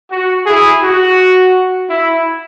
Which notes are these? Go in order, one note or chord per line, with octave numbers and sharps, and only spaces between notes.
F#4
E4 G#4
F#4
E4